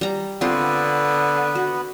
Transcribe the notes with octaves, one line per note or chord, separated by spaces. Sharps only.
G3 A#5
D3 B3 C4 F4 B4
F#4